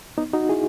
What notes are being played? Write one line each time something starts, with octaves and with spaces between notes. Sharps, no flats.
B3 D#4
D#4 F#4
E4 G#4